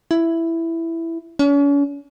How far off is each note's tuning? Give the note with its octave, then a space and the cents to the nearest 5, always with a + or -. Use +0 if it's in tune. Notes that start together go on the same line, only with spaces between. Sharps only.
E4 +5
C#4 +40